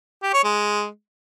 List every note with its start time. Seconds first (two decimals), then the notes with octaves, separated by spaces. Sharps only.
0.23 G4
0.34 C#5
0.44 G#3